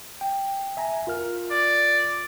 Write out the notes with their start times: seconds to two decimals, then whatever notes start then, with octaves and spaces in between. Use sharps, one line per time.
0.21 G5
0.77 E5 G#5 A#5
1.07 F4 A#4 F6
1.51 D5